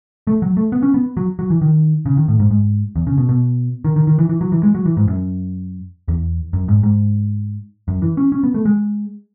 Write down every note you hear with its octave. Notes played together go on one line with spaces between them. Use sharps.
A3
F#3
A3
B3
C#4
B3
F#3
F#3
E3
D#3
C#3
D#3
A2
G#2
G#2
E2
C#3
B2
B2
D#3
D#3
D#3
E3
E3
F#3
E3
G#3
F#3
E3
G#2
F#2
E2
F#2
G#2
G#2
F#2
E3
C#4
C#4
B3
A3
G#3